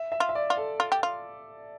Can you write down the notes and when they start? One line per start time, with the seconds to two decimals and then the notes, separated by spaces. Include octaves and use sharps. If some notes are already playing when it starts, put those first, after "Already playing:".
Already playing: E5
0.12 E5
0.20 F4
0.29 E5
0.35 D5
0.50 F4
0.57 A4
0.80 F4
0.92 G4
1.03 F4